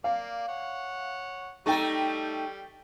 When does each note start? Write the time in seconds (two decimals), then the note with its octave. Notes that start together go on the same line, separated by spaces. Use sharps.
0.04 A#3 D5 F5
0.48 C#5 F#5
1.66 G3 A3 D#4 A4 G5 C#6